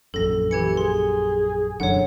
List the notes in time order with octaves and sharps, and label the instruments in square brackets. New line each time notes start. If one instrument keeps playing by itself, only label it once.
[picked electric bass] A#1 F#2 [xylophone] A4 A#6
[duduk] E3 [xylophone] G4 G#6 C#7
[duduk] G#4 [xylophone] C6
[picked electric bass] E1 F#2 D3 [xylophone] C#5 F#5